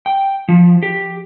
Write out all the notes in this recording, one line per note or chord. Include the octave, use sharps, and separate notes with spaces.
G5
F3
G4